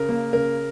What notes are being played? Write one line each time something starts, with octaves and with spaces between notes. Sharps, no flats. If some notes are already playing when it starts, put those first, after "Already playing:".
Already playing: C#3 A#4
A#3
C#3 A#4